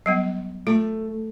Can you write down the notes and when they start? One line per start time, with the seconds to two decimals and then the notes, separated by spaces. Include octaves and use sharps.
0.06 F#3 G3 B3
0.67 A3 F4